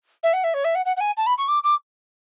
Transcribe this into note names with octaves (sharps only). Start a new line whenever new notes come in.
E5
F#5
E5
C#5
E5
F#5
F#5
F#5
G#5
A5
B5
C#6
D6
D6